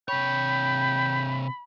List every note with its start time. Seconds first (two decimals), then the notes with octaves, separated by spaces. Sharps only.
0.08 C3 C#5 G5 B5